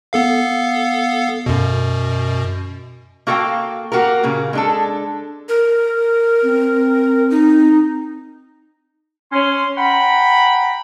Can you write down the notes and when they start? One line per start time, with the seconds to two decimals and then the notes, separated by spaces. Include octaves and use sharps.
0.13 B3 A4 F5
1.46 F#2 B2
3.27 A#3 F#4 A4 F5 G5
3.92 A#3 F#4 G4 A#4
4.23 A#2 C#3 A#3
4.53 G#3 D4 A4
5.49 A#4
6.44 C4
7.30 D#4
9.32 C#4 C6
9.77 F#5 G5 A#5 B5